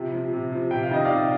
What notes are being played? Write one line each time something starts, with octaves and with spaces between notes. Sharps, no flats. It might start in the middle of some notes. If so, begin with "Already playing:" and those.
Already playing: C3 F3
F3
C3
F3
C3 G5
F5
D#3 D#5
D5 F5
C3